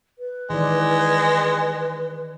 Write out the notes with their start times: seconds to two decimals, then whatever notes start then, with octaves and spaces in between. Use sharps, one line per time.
0.18 B4
0.50 D#3 E3 G#3 D5